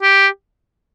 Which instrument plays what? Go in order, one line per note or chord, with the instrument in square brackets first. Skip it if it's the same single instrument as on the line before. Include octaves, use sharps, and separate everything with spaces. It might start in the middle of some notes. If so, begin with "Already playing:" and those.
[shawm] G4